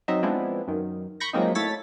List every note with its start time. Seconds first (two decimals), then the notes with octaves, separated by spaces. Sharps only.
0.08 F#3 C4 D#4 D#5 E5
0.23 F3 G#3 B3 C4 D4 E4
0.67 F#2 D#3
1.20 B5 C#6 G6 A#6
1.33 F3 F#3 G#3 A#3 C4 D#4
1.55 A2 A4 C#5 A6 B6